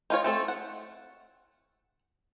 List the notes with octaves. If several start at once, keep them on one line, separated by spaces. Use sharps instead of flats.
D#4 F4 C#5
A3 C4 A4
F#5